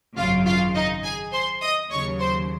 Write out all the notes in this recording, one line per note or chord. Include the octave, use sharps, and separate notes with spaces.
G#1 F#2 C#3 F4 F5
F4 F5
D#4 D#5
G#4 G#5
C5 C6
D#5 D#6
D#2 C#3 F#3 C#5 C#6
C5 C6